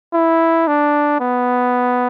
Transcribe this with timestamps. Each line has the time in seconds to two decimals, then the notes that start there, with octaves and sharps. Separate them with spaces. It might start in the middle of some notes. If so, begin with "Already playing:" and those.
0.14 E4
0.68 D4
1.21 B3